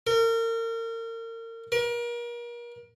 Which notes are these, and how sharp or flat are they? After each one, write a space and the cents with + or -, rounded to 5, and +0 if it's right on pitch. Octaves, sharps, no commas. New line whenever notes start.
A#4 -35
A#4 +35